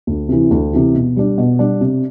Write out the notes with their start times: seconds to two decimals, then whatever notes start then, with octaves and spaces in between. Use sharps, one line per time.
0.07 D2
0.29 C3 E3
0.51 D2
0.73 C3 E3
0.95 B2
1.16 G3 D4
1.38 B2
1.59 G3 D4
1.81 C3